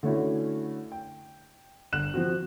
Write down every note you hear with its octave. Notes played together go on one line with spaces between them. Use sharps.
D3 A3 C#4 E4 F#4
G5
G1 F#6 E7
F3 C4 F#4